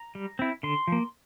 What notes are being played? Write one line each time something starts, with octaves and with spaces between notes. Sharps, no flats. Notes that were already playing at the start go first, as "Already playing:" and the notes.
Already playing: A#5
G3
C4 E4
D3 C6
F3 A#3